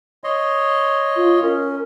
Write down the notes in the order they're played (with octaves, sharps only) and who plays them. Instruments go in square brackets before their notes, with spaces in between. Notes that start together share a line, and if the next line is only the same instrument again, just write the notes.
[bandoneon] C#5 D#5 C6
[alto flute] F4
[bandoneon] C#4 [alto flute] A#4